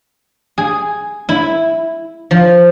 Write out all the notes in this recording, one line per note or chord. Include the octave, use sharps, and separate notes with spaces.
G#4
E4
F3